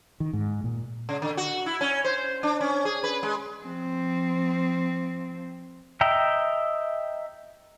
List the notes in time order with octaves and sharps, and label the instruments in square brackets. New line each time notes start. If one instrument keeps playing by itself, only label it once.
[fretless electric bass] D#3
G#2
A#2
[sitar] C#3
D3
F#4
E4
C#4
C5
D4
C#4
G#4
B4
G#3
[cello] F3 C4
[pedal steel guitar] D#5 E5 G5 A#5